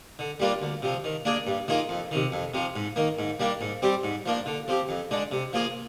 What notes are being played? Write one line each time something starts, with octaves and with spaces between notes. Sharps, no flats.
D3
G3 A#3 D4 F4
D2
C3 F3
D#3
A#3 D4 G#4
G2
D#3 A#3 F4 G#4
F2
C3 D#3
F2
C3 F3
G#2
D#3 A#3
G#2
G3 A#3 D4
G#2
G3 C4 G4
G#2
F3 A#3 D4
D3
F3 C4 G4
F2
D3 G#3 D4
C3
F3 A#3 F4 G#4